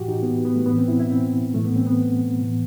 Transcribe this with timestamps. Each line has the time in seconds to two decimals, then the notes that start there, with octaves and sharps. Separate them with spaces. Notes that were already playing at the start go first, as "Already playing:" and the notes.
Already playing: A2 E3 F#4 G4
0.08 D#4
0.23 B3
0.45 B3
0.56 A3
0.66 A2 E3 B3
0.78 C4
0.88 E4
0.99 E4
1.10 C4
1.54 A2 E3 A3
1.65 B3
1.76 C4
1.86 B3
2.41 A2 E3